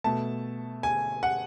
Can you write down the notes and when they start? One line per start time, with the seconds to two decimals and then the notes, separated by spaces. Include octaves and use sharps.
0.04 B2 A3 A5
0.83 G#5
1.23 F#5